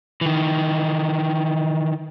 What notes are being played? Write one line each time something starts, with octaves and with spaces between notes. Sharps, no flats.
D#3 E3